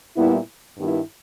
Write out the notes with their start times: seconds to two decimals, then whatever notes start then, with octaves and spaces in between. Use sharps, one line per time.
0.16 A#2 G3 B3 E4
0.77 G2 D#3 G3 B3 E4